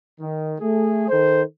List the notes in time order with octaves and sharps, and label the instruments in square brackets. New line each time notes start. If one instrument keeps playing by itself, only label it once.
[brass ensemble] D#3
A3 G#4
D#3 A4 C5